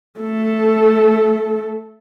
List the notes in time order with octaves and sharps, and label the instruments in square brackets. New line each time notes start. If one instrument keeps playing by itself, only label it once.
[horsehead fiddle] A3 A4